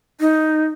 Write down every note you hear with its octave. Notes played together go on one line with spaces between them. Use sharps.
D#4